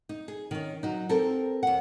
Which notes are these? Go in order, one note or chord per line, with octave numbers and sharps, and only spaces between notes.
D#4
G#4
D#3 C#4
F#3 D#4
C4 G4 A4 A#4
D#2 F#5